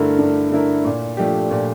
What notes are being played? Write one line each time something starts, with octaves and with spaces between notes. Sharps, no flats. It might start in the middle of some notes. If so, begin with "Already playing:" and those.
Already playing: G2 D3 A3 E4 A#4
G2
D3 A3 E4 A#4
A#2
F3 A3 D4 G4
A#2